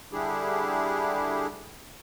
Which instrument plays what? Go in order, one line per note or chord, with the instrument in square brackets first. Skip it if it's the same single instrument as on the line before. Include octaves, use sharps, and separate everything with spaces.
[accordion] D3 G3 D4 E4 G4 G#4